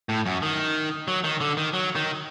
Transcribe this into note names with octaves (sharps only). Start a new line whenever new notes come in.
A2
F#2
D#3
F#3
D#3
D3
D#3
F#3
D#3